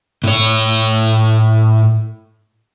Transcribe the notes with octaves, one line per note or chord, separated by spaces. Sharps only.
A2 C#5